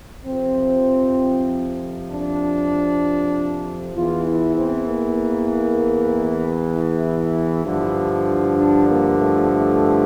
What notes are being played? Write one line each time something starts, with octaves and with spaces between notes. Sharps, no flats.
F2 C3 F3 C4
D4
E2 E3 F4
E4
C4
A#3
E4
G2 D3 F3
D4
A#3
A3
A3